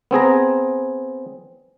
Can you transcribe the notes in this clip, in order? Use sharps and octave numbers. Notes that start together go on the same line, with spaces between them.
B3 C4 G#4 A#5